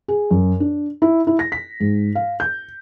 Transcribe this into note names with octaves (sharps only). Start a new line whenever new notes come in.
G#4
F#2
D4
E4
E4
A#6
B6
G#2
F5
G6